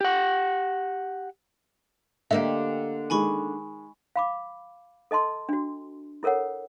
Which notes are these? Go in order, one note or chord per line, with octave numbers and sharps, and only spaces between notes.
G4 F#5
D3 A#3 G4 D#5 E5
D#3 G#3 G#5 B5 C#6
F5 B5 D6
A4 D#5 A5 C6
D4 F#4
E4 A4 A#4 C#5 F#5